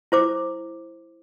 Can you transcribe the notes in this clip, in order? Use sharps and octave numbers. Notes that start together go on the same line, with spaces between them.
E4 C5 D6